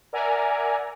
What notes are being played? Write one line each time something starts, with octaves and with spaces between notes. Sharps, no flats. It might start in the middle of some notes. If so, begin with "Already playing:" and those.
A#4 D5 E5 F#5 G#5 A#5